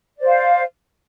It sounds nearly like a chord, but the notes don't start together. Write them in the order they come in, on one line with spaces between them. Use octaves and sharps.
D5 C5 F5